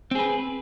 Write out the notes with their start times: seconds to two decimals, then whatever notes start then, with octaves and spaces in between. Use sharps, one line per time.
0.11 C4
0.15 G#4
0.19 B4